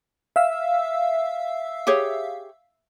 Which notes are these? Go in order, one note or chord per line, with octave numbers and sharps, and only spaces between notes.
E5 F5 E6
G4 G#4 C#5